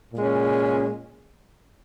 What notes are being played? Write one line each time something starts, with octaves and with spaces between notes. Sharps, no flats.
A#2 G#3 C#4